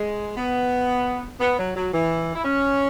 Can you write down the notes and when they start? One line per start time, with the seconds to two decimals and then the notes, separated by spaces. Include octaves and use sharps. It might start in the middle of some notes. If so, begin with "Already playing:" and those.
Already playing: G#3
0.37 B3
1.40 B3
1.58 F#3
1.76 F#3
1.93 E3
2.35 E4
2.45 C#4